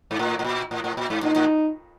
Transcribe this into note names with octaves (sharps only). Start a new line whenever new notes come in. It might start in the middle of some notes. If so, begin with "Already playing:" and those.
G#2
A2
A2
A#2
A2
A2
A#2
G#2
A2 D#4
A2